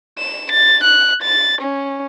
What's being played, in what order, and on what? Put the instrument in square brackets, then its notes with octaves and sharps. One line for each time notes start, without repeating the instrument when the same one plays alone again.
[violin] E7
A6
F#6
A6
C#4